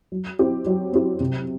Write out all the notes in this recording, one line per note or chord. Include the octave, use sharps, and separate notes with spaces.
F#3
C4 E4 G4
F#3
C4 E4 G4
C3